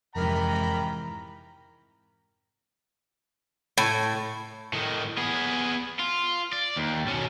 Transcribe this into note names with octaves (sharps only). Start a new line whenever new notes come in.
F2 G#2 C3 E3 A#4 G5 A#5 B5
A2
A2 D#3
B3 G#4
F4
D5
D#2
B2 C#4